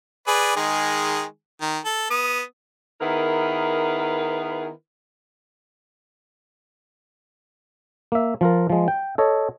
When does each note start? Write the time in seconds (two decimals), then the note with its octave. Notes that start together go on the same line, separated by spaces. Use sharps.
0.27 G#4 B4 D5
0.56 D#3 G#3 G#4
1.61 D#3
1.85 A4
2.10 B3 D#6
3.01 D#3 B3 E4 G#4 A#4 B4
8.12 A#3 E5
8.41 F3 F4 A#4
8.70 F3 G#3
8.88 G5
9.18 A4 C#5 D#5